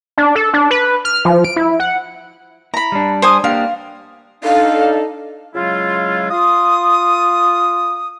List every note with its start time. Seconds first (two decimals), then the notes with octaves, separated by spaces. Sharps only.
0.18 D4
0.35 A4
0.53 D4
0.71 B4
1.05 F6
1.25 F3
1.44 D7
1.56 E4
1.80 F#5
2.74 E4 A#5 B5
2.92 G3 D4
3.22 C5 G#5 D#6
3.44 A#3 D4 G4 F5
4.44 D4 D#4 A4 F5
5.55 C#3 F#3 G#3 E4 F4
6.31 F4 D#6